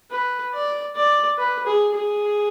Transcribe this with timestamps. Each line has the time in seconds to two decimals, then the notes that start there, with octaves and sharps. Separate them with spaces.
0.11 B4
0.53 D5
0.96 D5
1.38 B4
1.66 G#4
1.94 G#4